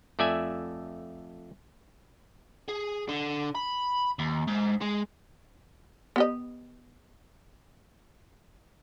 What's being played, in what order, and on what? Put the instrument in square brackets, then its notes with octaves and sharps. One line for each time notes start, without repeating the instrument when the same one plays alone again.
[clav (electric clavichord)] F2 A3 D5 E5 G#5
[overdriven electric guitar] G#4
D3
B5
D#2
G#2
G#3
[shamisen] B3 G4 D#5